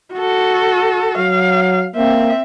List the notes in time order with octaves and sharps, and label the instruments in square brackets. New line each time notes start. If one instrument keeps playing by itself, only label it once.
[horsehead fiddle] F#4 A4
[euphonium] F#3 [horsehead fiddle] F5
[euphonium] A#3 [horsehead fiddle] C4 E5